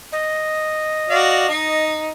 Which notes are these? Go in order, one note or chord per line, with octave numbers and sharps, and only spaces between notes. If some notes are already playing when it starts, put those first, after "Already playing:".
D#5
F#4 D5 F5
D#4